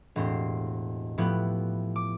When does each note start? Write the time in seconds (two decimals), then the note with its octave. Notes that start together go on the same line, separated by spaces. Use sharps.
0.16 E1 A2 C4 G4 C7
1.18 A2 F3 B3 E4 G4 F#6
1.96 D6